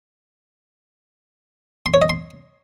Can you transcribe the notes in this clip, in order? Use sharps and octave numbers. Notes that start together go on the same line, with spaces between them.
C6
C#5
D#5
C6